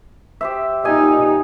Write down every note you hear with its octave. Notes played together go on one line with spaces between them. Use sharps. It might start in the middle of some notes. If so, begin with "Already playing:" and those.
G4 C5 E5
A#2 D#4 G4 D#5 G#5